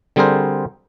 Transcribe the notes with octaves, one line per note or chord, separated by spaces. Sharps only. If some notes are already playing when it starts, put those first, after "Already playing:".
D3 G3 C4 G#4 A#4 C5